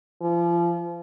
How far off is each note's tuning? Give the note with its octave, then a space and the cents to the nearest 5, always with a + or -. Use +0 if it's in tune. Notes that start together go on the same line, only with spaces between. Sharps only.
F3 -30